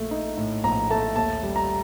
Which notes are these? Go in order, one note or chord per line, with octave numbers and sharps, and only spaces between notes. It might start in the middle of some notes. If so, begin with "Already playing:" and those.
Already playing: A#1 A3
D#4
A2
A#1 A#5
A3 A5
D#2 A5
G3
A#5